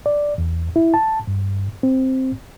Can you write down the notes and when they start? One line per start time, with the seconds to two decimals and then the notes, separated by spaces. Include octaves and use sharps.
0.06 D5
0.38 E2
0.76 E4
0.94 A5
1.27 G2
1.83 C4